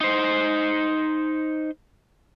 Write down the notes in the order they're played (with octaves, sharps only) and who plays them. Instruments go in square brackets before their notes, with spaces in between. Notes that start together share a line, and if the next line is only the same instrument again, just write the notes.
[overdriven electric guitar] D#4 C5